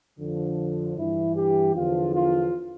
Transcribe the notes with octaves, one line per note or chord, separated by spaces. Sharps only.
F2 D3 F3
G2 E3 E4
G4
E2 D3 F3 F4
F4